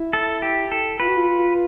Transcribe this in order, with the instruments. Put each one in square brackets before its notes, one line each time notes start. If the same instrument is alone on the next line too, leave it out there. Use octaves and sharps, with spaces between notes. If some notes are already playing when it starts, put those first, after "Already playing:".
Already playing: [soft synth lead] E4
[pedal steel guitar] A4
G4
A4
[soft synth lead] F4 [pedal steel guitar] B4
[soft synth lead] F#4
F4